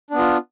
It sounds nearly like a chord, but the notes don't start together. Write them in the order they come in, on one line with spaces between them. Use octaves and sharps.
D4 B3 F4